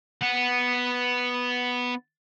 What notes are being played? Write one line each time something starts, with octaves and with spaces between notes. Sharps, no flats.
B3 F#5